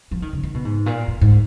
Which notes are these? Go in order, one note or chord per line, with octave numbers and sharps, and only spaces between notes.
F3
D#3
C#3
D#3
B2
G#2
A#2
A#2
G#2